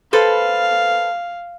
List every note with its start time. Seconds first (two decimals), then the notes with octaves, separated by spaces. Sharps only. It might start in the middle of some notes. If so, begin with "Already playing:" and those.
0.13 A4 B4 C5 F5